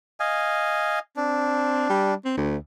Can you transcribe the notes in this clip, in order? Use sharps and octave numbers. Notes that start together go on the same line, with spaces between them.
D#5 F5 G#5
C4 D4
G3
C4
D2